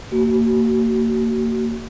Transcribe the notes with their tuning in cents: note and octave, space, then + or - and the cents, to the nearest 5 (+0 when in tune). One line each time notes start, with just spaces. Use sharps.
A#3 -25 F#4 +40